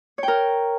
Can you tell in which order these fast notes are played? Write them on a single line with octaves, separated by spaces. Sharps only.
C#5 G5 A#4